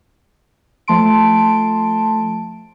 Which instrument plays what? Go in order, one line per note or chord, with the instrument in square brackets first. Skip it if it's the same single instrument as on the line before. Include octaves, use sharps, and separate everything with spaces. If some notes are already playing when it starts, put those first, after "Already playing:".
[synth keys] F3 A3 A5 C6 D7